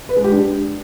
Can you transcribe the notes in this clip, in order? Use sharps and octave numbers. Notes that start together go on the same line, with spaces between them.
B4
G#3
G4
D4